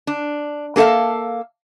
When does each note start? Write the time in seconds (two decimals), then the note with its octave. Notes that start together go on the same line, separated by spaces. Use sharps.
0.07 D4
0.76 A#3 G#4 A4 E5 F5